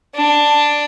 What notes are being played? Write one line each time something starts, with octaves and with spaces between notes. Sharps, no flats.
D4